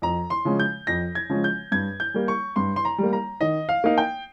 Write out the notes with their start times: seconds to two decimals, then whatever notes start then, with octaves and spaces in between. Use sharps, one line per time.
0.02 F2 A#5
0.30 C6
0.45 C#3 F3 G#3 C#4
0.59 G6
0.87 F2 A#6
1.15 G#6
1.29 C#3 F3 G#3 C#4
1.44 G6
1.72 G2 G#6
2.00 G6
2.14 G3 A#3
2.28 C#6
2.56 G2 C6
2.76 C6
2.85 A#5
2.98 G3 A#3
3.13 A#5
3.41 D#3 D#5
3.69 F5
3.84 A#3 D#4 F5
3.98 G5